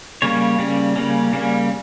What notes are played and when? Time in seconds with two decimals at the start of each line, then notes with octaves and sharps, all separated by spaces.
0.22 C#3 G3 A#3 C#4 C#5
0.59 C#3 G3 A#3 C#4
0.96 C#3 G3 A#3 C#4
1.33 C#3 G3 A#3 C#4